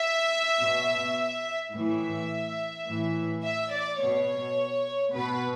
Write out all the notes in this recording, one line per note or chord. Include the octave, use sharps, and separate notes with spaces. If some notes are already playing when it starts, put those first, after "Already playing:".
Already playing: E5
B2
A2 E3 E5
A2 E3
E5
D5
B2 C#5
B2 B4